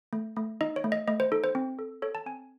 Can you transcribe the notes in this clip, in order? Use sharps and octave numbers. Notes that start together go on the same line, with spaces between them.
A3
A3
D#4 D#5
C#5
A3
D#5
A3 D#5
C5
D#4 A4
C5
C4
A4
A4 C#5
A5
C4 G#5